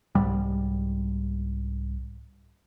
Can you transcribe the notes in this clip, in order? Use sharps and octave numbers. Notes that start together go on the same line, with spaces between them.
C2 G#2 G3